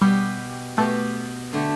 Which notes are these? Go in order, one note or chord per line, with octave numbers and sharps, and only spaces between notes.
B2 G3 B3 G4
B2 A3 B3 G4
D3 A3 G4